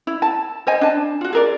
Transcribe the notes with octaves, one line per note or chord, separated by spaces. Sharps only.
E4
A5
C5 D#5 G#5
D4 A5
F4 F#4
G#4 A#4 D5